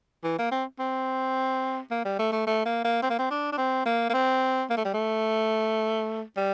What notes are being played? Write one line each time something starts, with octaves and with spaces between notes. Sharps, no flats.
E3
A#3
C4
C4
A#3
G3
A3
A3
A3
A#3
A#3
C4
A#3
C4
D4
D4
C4
A#3
A#3
C4
A#3
A3
G3
A3
G3